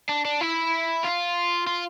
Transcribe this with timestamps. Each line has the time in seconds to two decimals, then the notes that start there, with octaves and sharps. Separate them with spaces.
0.09 D4
0.25 D4
0.41 E4
1.04 F4
1.67 F4